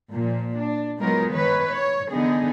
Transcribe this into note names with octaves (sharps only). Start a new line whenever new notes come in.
A#2 F3
D4
F#3 G#3 B3 D#4 F4 A#4
D#3 B4 C#5
C#5
D3 E3 B3 D#4 G#4